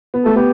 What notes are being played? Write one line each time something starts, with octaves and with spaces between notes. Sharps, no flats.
B3
A3 A4
B3 G4